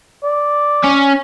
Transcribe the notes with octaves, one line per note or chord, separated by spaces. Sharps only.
D5
C#4